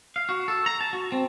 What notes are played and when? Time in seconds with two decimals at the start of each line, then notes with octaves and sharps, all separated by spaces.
0.16 F5
0.29 F#4
0.48 A4
0.66 A#5
0.81 A5
0.93 F#4
1.12 C4